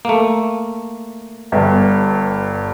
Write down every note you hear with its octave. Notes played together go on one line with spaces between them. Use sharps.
A3 A#3
G1 G2